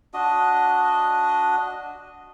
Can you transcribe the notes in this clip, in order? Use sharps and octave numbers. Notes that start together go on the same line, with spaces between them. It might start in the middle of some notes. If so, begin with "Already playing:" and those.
D4 F#4 D#5